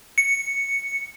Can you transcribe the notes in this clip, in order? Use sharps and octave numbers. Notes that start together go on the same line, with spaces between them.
C#7